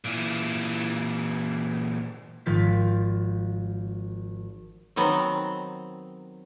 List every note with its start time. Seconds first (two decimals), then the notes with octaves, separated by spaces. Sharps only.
0.04 A#2 E3
2.46 G#1 F3 A6 B6
4.96 D#3 F#3 B3 C4 A#5